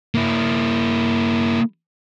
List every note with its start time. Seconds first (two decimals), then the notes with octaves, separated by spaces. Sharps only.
0.15 A#3 E4